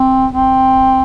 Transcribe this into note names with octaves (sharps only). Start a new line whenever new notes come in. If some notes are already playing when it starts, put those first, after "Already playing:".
Already playing: C4
C4